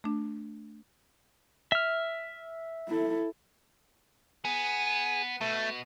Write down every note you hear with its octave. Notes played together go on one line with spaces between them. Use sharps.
A3 D4
E5 F6
E4 A4
B3 G#4
B2 A3